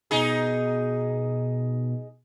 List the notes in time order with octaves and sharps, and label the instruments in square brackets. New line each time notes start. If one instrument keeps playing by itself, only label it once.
[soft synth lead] B2 [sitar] D#4 G#4